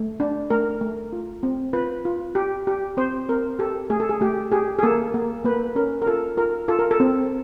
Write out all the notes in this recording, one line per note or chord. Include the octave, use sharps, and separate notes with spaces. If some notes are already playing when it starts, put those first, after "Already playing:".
Already playing: A3
D4
A3 A#4
A3
F4
C4
F4 B4
F4
G4
G4
C4 C5
C4 A#4
G4 A4
A3 G#4
A4
G#4
A3 G4
G4 G#4
G#4
A#3 A4
A#3
A#3 B4
C#4 A#4
A#4
F4 A4
F4 A#4
F4 A4
A#4
A4
C4